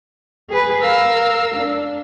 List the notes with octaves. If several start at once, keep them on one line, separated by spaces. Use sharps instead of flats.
G#4 B4
A#4 F5 E6
D4